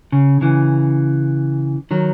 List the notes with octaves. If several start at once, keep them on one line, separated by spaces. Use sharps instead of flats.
C#3
C#3 E3
D#3 F#3